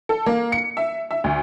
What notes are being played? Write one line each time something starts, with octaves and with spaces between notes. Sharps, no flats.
A4
A#3
C#7
E5
E5
D2